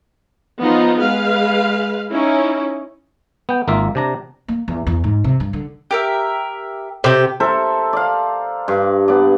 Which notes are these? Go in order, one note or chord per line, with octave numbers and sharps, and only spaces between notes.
F3 B3 D#4 F4
G#3 B4 F5
C#4 D#4 E4
B3 G5
G#1 A#3 F4 E5
C3 D4 A#5
A#3
E2
E2
G#2
C3
G2
D3
G4 A#4 E5
C3 G4
A4 A#4 C5 E5
D5 F5
G2
B3 D5